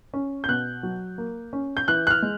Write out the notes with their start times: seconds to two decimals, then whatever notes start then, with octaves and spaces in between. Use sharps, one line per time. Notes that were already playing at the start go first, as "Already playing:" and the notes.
0.14 C#4
0.44 G6
0.48 B2 F#6
0.83 F#3
1.18 A#3
1.53 C#4
1.77 G6
1.88 E3 F#6
2.07 F#6
2.11 F6
2.22 G#3